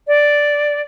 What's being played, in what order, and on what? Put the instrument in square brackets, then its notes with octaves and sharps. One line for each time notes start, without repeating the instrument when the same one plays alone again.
[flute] D5